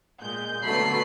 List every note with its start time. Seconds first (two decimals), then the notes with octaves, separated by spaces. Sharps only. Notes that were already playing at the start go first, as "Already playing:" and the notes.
0.22 A#2 G#3 G6
0.63 B2 D3 F#3 A3 B5 C7